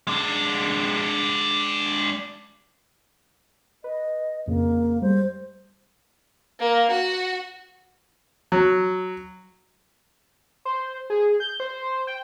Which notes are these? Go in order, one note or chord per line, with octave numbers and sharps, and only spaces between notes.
G#3 D4
B4 D#5
F2 C#3 A#3
G3 G#3 C5
A#3
F#4
F#3
C5
G#4
G6
C5
G5